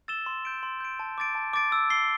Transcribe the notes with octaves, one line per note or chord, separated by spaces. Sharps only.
E6 A6 E7 G7
C6
G6 D7
C6
G6 D7
A5
D6 A6 D7
A5
D6 A6 D7
E6
C7 G7